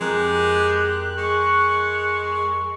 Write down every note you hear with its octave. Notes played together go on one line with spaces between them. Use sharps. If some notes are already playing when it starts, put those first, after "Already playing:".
F2 G#3 G4 A#4 F#6
G#3 C#6